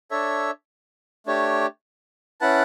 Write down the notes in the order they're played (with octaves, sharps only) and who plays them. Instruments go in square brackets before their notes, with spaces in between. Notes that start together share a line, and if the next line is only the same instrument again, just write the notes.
[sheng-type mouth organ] D4 A4 C#5 E5
A3 D4 G4 C#5
C#4 E4 B4 F#5 A5